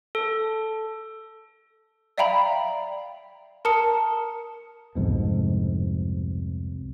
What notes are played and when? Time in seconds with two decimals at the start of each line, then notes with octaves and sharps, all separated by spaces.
0.15 A4
2.18 D5 E5 F5 G5 A#5 B5
3.65 A#4 A5 A#5 D#6 C#7
4.95 C2 F2 G#2 B2